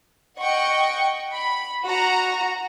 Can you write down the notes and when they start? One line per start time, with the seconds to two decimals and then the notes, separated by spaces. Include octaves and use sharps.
0.40 D#5 F#5 G5 C#6
1.33 B5
1.84 F#4 F#5 A#5